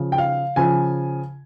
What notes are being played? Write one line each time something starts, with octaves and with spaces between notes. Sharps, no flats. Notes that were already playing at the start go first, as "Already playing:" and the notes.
Already playing: C#3 F3
G5
F5
C#3 F3 G#5